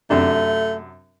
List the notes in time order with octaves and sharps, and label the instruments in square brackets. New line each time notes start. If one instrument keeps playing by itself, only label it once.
[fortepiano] F#2 C3 D4 [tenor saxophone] A3